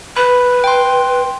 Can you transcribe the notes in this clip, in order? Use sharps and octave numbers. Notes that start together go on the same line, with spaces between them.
B4 B5
G5 C6